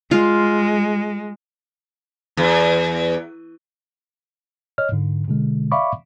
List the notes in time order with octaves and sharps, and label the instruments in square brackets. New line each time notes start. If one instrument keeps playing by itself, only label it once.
[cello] G#3 [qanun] F4
[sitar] E2
[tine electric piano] C#5 D#5 F6
G#2 D3
B2 D3 G#3
D5 E5 F5 B5 C#6 D6